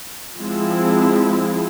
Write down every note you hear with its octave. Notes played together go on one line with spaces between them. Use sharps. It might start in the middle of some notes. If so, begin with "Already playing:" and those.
F3 G#3 C4 E4